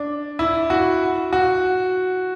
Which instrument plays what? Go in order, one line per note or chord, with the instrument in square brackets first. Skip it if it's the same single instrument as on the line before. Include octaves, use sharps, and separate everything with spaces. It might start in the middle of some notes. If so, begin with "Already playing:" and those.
Already playing: [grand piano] D4
E4
F#4
F#4